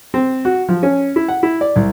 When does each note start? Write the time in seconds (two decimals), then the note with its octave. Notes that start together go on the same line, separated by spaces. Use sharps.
0.14 C4
0.45 F#4
0.69 F3
0.83 C#4
1.16 E4
1.28 F#5
1.43 E4
1.61 D5
1.76 C2